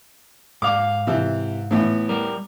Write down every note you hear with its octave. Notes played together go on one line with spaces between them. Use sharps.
G#2 F5 D6
C3 E3
A2 E3 B3
G3 A#4